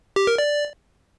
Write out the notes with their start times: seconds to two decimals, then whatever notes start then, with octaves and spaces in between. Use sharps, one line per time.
0.16 G4
0.27 A#4
0.38 D5